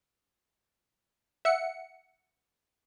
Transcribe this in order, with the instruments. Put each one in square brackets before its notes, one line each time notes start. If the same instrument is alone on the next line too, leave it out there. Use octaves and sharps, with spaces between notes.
[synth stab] E5 F#5 C#7